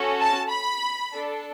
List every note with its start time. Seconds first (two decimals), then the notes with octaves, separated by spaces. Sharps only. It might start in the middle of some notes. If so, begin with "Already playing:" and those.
Already playing: C#4 F#4 A4
0.20 A5
0.51 B5
1.12 D4 A4